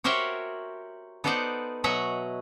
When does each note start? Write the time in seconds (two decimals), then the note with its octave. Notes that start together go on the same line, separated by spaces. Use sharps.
0.04 F#4 G4 A#4 C5 C#5 E5
1.24 B3 D#4 A4 C5 D5 F#5
1.84 B2 F#3 D#5 E5 F#5 A#5